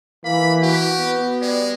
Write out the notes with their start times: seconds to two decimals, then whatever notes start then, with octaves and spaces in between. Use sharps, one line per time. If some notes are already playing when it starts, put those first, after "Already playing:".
0.24 E3 A#3 B5
0.62 F#4 G4
0.99 B3
1.42 G3 G#3